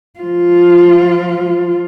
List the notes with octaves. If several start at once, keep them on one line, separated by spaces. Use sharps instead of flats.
F3 F4